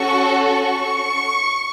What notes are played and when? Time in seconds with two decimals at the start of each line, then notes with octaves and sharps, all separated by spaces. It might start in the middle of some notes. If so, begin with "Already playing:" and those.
Already playing: C#4 F#4 A4 C#6
0.46 C#6